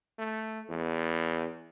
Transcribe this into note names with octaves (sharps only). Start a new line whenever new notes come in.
A3
E2